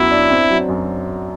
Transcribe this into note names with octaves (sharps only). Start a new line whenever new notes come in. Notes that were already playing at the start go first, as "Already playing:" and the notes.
Already playing: F#2 F#3 B3 E4
D4
C4
F#3
F#2